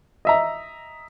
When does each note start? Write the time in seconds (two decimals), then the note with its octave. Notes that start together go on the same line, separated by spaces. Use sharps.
0.25 D#5 E5 A#5